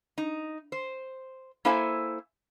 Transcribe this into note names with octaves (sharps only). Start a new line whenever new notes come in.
D#4
C5
A#3 E4 A4 C5 E5 G#5